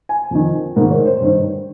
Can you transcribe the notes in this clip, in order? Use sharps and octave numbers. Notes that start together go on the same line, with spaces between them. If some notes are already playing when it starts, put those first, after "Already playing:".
G#5
F2 D#3
G#2 D#3 A#4
C#5
C5
G2 D#3